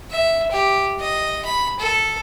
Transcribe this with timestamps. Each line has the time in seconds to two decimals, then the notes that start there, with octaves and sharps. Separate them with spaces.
0.11 E5
0.51 G4
1.00 D#5
1.45 B5
1.79 A4